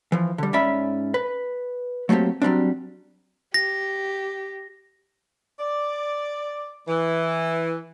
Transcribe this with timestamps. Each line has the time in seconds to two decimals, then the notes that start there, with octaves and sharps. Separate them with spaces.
0.12 E3 F3
0.38 D3 G3
0.53 G#2 C#4 D5 E5 B5
1.14 B4
2.09 F#3 A3 A#3 C4 G4
2.42 F#3 G3 C4 D4
3.54 G4 A#6
5.60 D5
6.88 E3